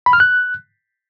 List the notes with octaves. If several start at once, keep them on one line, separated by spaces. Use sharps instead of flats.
B5
F6
F#6